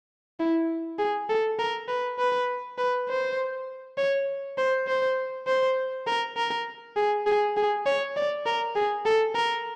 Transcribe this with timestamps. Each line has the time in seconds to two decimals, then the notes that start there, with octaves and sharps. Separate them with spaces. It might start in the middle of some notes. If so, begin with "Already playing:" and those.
0.40 E4
0.99 G#4
1.29 A4
1.59 A#4
1.88 B4
2.19 B4
2.78 B4
3.08 C5
3.98 C#5
4.58 C5
4.87 C5
5.47 C5
6.07 A#4
6.37 A#4
6.96 G#4
7.26 G#4
7.57 G#4
7.86 C#5
8.16 D5
8.46 A#4
8.76 G#4
9.05 A4
9.35 A#4